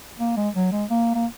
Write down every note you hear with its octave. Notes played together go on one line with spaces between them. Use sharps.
A#3
G#3
F#3
G#3
A#3
A#3